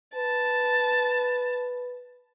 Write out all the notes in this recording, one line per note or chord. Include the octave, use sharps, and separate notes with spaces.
B4 A5